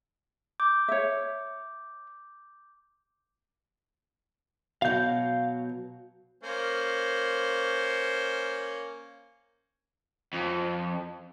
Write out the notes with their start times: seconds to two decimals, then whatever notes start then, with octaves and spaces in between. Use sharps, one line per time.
0.60 D6 G6
0.88 C#5 E5
4.82 B2 F#3 F5 G6
6.43 A#3 C#4 C5
10.34 F2